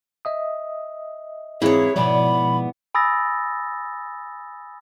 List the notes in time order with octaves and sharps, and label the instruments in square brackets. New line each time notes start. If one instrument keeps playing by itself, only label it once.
[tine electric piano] D#5 E5 D#6
[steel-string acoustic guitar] F2 G#2 E3 [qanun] E4 C#5 [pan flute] G#4
[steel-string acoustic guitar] G#2 B3 D5 [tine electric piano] B2 F3 [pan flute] B5
[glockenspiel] G#5 B5 D#6 E6 A6 A#6